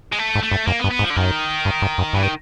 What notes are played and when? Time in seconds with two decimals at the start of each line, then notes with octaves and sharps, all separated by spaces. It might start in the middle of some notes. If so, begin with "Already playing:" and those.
0.12 G#3
0.18 A3
0.35 G#2
0.43 A3
0.51 G2
0.67 F#2 A#3
0.80 B3
0.84 G2
0.91 B3
0.99 G#2
1.04 F3
1.10 D3
1.16 F#2 D#3
1.65 G2
1.82 G2
1.98 F#2
2.13 G2 E3
2.23 D#3